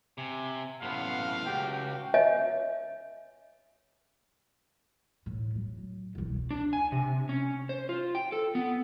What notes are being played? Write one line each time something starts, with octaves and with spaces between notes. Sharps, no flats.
C3 G#5
F#2 A2 B3 F5 F#5 C6
C#2 F#4 G4 G5
C#5 D#5 E5 G#5
A2
F#3
E1 C2
D4
G#5
C3
C#4
C5
F4
G5
A4
B3